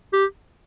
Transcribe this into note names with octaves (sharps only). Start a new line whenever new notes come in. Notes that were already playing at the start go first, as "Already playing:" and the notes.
G4